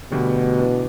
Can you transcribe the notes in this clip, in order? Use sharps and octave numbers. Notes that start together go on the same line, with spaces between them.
D2 B2 D3 G3
E3 B3 D4